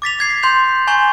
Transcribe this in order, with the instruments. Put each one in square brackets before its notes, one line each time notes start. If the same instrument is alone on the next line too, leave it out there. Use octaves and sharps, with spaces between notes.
[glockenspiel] D6 A6 B6 F7
D6 G#6 C7
C6 G6 F7
G#5 A#5 C6 C#6 G6